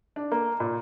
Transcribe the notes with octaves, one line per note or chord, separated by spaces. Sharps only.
D4
A#3
A#2